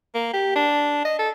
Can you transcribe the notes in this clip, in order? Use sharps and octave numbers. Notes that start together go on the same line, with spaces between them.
A#3
G4
D4
D#5
A4